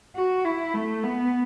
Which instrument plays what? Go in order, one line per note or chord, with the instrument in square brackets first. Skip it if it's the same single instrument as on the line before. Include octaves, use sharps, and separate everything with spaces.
[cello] F#4
E4
A3
B3